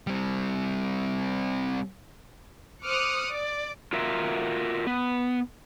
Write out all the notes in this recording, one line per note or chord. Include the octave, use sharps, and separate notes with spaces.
G3 C4
C5 D6 D#6 F6 F#6 C#7
D5
F4 F#4 A#4 E5
B3